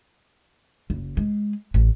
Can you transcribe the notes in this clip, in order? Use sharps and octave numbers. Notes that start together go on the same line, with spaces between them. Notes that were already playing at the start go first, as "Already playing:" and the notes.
F#1
G#3
A1